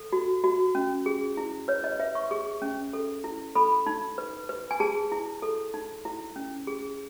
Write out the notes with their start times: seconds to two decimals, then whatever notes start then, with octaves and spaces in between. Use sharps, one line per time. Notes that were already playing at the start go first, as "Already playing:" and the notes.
Already playing: A4
0.13 F#4
0.44 F#4
0.75 C#4
1.06 G#4
1.37 E4
1.68 B4 C#5
1.84 D#5
1.99 B4 E5
2.15 C#6
2.31 G#4 C#6
2.62 C#4
2.93 A4
3.24 E4
3.56 A4 B5
3.87 D#4
4.18 B4
4.49 B4
4.71 G#5
4.80 G#4 A5
5.12 E4
5.42 A4
5.74 D#4
6.05 E4
6.36 C#4
6.67 G#4